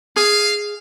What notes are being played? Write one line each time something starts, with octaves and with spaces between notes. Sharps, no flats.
G#4 F5